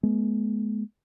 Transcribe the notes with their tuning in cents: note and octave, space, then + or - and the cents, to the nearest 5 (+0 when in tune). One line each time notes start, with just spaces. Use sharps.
G#3 +30 B3 -30